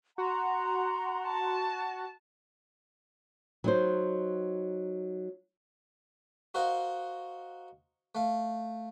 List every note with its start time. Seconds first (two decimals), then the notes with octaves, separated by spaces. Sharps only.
0.18 F#4 F#5 A#5 C6
1.27 A5
3.64 F#3 D#4 C5
6.54 F#4 A#4 C5 D#5 F5
8.15 A3 F5